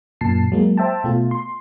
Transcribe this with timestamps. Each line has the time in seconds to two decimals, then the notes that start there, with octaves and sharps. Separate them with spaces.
0.21 F#2 A#2 A5 C7
0.52 F#3 G#3 A#3
0.78 C5 E5 G5 A5
1.04 B2 A3 F4
1.31 C6